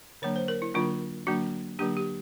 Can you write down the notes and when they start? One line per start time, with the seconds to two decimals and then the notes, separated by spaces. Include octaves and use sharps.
0.22 D3 F#3 A#3 D4 C#5
0.36 C5
0.48 A#4
0.62 E4
0.74 D3 F#3 A#3 D4 F4
1.27 D3 F#3 A#3 D4 F#4
1.79 D3 F#3 A#3 D4 G4
1.97 G4